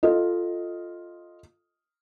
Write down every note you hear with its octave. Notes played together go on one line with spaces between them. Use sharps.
F4 A4 D#5